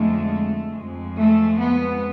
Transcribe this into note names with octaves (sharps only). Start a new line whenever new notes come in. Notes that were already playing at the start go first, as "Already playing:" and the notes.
Already playing: F2 D3 F3 G#3 A3
F2 F3 G#3
A3
B3